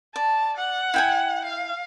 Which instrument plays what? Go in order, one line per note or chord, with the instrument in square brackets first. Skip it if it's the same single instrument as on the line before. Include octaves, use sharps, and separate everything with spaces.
[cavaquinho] D5 [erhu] A5
[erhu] F#5
[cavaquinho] E4 G5 G#5
[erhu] F5